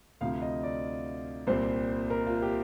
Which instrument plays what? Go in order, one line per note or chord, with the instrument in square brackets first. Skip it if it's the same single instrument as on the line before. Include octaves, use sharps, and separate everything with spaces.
[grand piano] D2 C3 F3 F5
D#5
D5
C2 A#2 G3 C4 C5
A#4
F4
G4